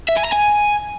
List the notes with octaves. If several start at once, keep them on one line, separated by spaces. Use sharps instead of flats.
E5
G#5
A#5
G#5